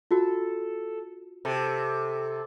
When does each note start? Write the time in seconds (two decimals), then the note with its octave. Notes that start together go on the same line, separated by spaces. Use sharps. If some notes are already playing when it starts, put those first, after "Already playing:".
0.11 F4 F#4 A4
1.45 C3 A4